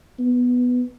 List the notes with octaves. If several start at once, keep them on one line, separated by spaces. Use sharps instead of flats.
B3